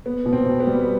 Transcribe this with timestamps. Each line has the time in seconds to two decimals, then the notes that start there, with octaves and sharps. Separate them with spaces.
0.06 B3
0.26 B2
0.33 C4
0.46 B2
0.60 B3
0.67 G3